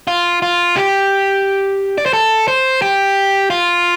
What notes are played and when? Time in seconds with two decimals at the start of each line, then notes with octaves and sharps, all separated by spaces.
0.07 F4
0.42 F4
0.77 G4
1.98 D5
2.06 C5
2.13 A4
2.48 C5
2.82 G4
3.50 F4